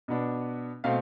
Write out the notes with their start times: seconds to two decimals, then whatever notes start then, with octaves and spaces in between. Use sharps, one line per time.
0.08 B2 B3 D4
0.84 B2 A3 C4 F5